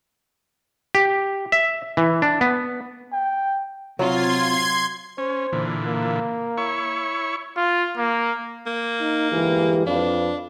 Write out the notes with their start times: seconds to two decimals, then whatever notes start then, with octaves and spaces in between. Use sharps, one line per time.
0.95 G4
1.52 E5
1.97 E3
2.22 D4
2.41 B3
3.13 G5
3.99 C3 F#3 F4 C6 G#6
5.18 C#4 C5
5.53 A#2 D3 E3
5.84 A#3
6.58 E4 C#5 C#6
7.57 F4
7.97 A#3
8.66 A#3
9.01 D#4
9.32 G1 E3 G#3 G4
9.87 F2 D4 B4 F5